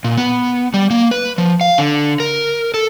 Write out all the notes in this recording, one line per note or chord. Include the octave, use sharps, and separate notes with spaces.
A#2
B3
G3
A#3
B4
F3
F5
D3
A#4
A4